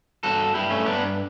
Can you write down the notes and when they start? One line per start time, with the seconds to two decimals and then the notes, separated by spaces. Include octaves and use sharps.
0.23 G2 F#4 A4
0.54 G2 E4 G4
0.70 A3 C#4
0.85 G2 B3 D4